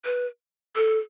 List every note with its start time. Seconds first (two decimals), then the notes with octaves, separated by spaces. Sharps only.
0.05 B4
0.76 A4